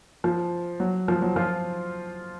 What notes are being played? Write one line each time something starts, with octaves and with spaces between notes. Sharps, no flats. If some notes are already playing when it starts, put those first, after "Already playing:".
F3
F#3
F3
F#3
F3 F4